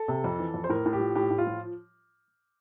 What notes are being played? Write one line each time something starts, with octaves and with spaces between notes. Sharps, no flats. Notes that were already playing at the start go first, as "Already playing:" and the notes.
Already playing: A4
C3
F2
E3
F2
C5
A2 A#4
A2
G4
F3
A2 G4
A2
F4
F3